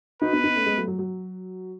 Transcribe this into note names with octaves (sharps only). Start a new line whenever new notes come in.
D#4 F#4 B4
B3 D#4
B3 D#4
A3 C#4
G#3 B3
F#3 A3
F#3
F#3